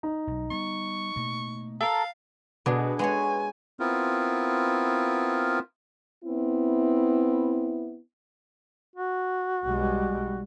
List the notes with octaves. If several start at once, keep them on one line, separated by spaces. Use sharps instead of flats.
D#4
B1 F#3
G3 B3 C#6
B2 A3 A#3
A4 A#4 F5
B2 B3 D4 G#4
G#3 F#4 B4 C#5 G#5
B3 C4 E4 F4 A#4
B3 C4 E4
F#4
B1 G3 G#3